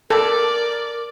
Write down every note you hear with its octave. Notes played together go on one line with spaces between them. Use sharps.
A4 A#4 D5